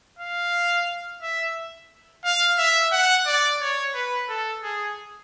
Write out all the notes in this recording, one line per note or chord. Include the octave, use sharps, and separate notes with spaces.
F5
E5
F5
E5
F#5
D5
C#5
B4
A4
G#4